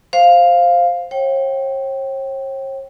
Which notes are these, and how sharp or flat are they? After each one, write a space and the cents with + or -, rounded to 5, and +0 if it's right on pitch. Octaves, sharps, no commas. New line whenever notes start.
C5 +0 F5 +0
C#5 -45 G5 -20